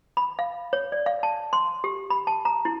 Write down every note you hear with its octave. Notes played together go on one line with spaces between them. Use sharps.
B5
F5
C#5
D5
F5
A5
C6
G4
B5
A5
A#5
E4